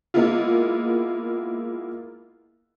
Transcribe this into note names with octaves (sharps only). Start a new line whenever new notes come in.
G#3 A#3 B3 E4 F4